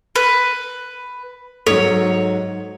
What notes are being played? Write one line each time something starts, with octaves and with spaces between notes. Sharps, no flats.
B4
G#2 F#3 A4 C#5